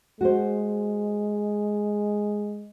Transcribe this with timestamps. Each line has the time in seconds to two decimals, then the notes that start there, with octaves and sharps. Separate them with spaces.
0.21 G#3 F#4 C5